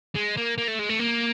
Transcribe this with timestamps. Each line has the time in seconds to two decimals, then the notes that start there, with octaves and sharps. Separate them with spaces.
0.16 G#3
0.37 A#3
0.58 A#3
0.68 A3
0.79 G#3
0.89 A3
0.99 A#3